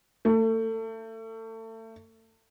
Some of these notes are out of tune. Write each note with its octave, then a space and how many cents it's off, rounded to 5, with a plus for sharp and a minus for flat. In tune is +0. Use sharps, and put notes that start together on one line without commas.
A3 +30